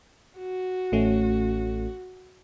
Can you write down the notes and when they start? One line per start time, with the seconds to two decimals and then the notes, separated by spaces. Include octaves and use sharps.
0.38 F#4
0.92 A1 A3 C#4